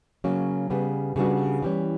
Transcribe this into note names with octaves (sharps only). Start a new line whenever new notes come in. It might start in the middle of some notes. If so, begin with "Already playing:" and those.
C#3 F#3 A#3 C#4
C#3 G3 B3
C#3 G3 B3 D4 F#4
E3 G3 C#4